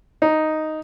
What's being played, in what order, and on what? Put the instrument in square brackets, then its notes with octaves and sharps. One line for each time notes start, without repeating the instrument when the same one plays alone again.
[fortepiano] D#4